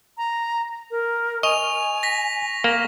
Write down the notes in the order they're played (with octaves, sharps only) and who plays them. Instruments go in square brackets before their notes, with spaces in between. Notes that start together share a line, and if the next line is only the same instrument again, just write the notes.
[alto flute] A#5
A#4
[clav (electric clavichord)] D#5 [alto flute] G#5 [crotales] C#6 F7
[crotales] A#6 B6
[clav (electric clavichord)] A#3